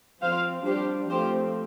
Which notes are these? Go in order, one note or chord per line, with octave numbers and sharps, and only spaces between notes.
F3 C4 C5 F5
G3 D4 G4 C5
F3 A3 C4 G4 C5